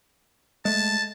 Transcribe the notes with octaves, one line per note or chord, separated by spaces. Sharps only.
G#3 A3 A5